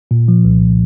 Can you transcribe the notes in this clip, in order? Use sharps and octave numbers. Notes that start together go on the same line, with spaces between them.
A#2
F3
C2